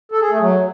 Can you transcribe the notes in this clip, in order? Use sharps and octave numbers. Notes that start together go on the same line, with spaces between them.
A4
G#4
A3
F#3